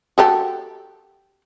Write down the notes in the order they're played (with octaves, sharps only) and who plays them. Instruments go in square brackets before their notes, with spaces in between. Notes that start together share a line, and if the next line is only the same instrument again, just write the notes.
[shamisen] F#4 G4 A4